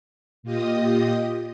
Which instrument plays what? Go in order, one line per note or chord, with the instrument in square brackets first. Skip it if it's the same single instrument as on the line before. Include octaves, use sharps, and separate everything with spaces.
[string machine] A#2 F4 G4 D#5 D#6